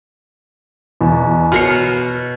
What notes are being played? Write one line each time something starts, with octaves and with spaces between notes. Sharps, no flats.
E2 B2
B2 A#4 C#5 F6 C7